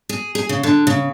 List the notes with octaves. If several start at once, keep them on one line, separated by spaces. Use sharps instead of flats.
G#4
G#4
C#3
D3
C#3